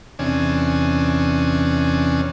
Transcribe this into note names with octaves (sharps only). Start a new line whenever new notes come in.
E2 C3 C#4 D4 G#5